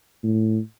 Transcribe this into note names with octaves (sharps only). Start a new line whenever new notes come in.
A2